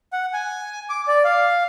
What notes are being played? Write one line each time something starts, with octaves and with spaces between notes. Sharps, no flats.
F#5
G#5
D6
D5
F5